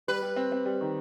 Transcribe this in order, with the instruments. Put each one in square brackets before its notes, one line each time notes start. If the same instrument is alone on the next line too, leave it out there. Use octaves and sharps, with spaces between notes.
[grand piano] G3 [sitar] B4
[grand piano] G3
C4
C4
G3
D#3